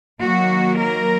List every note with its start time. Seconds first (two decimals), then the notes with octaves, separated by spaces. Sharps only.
0.23 D#3 F#3 A#3 F#4
0.79 A#4